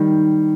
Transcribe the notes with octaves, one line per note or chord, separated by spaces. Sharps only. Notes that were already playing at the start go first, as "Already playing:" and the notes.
Already playing: D#3 G3